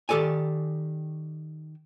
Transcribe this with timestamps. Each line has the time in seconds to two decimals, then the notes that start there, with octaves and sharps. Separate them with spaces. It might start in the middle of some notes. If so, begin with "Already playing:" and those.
0.09 D#3 G4 A4 D5 G#5